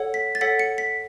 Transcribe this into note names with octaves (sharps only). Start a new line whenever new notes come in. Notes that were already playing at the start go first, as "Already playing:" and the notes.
Already playing: A4 C#5 F#5
B6
A6
A4 C#5 F#5 B6
C#7
B6